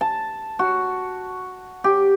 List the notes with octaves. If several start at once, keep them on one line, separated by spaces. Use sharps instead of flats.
A5
F#4
G4